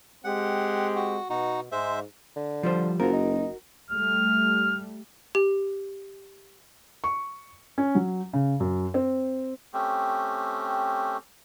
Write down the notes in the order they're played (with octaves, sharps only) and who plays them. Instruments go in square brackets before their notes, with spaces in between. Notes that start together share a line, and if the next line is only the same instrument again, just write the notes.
[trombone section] G#3 C4 G4 [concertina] F#5
[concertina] F#4
[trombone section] B2 [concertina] D#4 F#4
[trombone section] G#2 [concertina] G#3 C5 E5
[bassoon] D3
[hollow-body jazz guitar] F3 G3 C5
[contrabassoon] F#1 [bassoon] F3 [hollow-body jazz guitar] F#4 A#4
[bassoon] D#4
[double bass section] G3 A3 [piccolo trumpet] F6
[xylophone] G4
[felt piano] C#6
C#4
F#3
C#3
F#2
C4
[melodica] A3 C4 C#4 G4